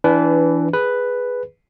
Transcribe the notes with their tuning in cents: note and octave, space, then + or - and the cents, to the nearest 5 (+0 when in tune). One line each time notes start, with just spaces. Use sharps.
E3 +0 D4 -25 B4 +10
G#4 +0 B4 +0